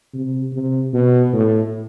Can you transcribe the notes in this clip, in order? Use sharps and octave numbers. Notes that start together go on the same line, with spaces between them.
C3
C3
B2
A2